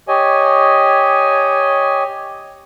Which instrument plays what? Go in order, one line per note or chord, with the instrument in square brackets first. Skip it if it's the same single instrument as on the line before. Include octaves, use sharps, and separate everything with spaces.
[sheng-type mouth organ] G4 C#5 D#5 G#5